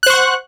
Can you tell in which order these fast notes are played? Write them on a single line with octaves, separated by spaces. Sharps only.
F#6 C5 C#6 F#5